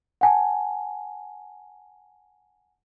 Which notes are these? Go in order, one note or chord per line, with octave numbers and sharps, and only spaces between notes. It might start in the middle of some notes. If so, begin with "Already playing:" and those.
F#5 G#5 A5